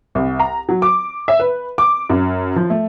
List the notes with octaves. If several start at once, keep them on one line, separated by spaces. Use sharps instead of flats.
C2
A#5
F#3
D6
E5
B4
D6
F#2
F3
A3